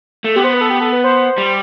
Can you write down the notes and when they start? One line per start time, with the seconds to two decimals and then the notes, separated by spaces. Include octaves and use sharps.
0.24 A3
0.36 B3 G4
0.44 C5
0.53 B4
0.61 A4
0.70 G4
0.81 A4
0.93 B4
1.04 C5
1.38 G3